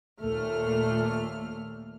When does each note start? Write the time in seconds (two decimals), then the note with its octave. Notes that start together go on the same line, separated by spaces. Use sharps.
0.22 D#2 A#2 A3 F6